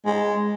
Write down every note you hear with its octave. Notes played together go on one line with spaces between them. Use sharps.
G#3